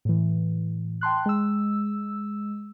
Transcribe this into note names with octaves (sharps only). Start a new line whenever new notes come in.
A2 E3
G5 A5 C6 F#6
G#3 E6